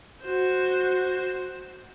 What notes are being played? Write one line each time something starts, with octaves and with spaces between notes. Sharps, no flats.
F#4 C5